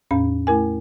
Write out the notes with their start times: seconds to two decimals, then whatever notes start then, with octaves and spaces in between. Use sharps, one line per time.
0.11 E2 A2 C#4 B5
0.47 A3 E4 A#4 G#5